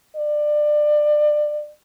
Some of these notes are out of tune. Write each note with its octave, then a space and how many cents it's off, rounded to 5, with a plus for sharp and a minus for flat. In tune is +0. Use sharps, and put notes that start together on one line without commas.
D5 +25